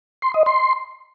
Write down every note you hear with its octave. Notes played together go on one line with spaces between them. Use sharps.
C6
D#5
C6